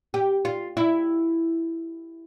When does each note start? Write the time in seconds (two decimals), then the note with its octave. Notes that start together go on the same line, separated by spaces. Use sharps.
0.14 G4
0.45 F4
0.77 E4